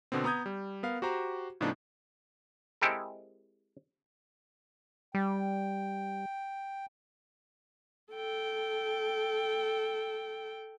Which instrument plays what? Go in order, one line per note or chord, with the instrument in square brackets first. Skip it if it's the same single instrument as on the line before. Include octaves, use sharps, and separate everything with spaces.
[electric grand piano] B2 D3 B3 C4
B3 A#5 D#6 G6 G#6
G3
B3 A#4 F5
F#4 G4 C5 A#5
A2 C#3 F3 B3 D4 D#4
[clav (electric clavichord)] G#3 C4 E4 G4 A4 A#4
[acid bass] G3 [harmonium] G5
[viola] A4 G5